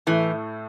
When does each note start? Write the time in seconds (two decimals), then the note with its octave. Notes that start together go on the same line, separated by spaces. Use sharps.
0.07 A2 E3 A3